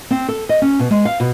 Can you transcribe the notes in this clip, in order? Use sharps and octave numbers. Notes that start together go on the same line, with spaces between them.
C4
A4
D#5
C#4
B2
G#3
F5
B2